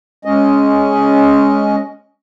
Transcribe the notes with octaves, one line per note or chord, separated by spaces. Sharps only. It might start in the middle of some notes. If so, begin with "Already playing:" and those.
G#3 C#4 D#5